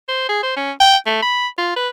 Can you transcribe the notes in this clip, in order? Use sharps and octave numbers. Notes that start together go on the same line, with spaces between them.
C5
G#4
C5
C#4
G5
A3
B5
F4
B4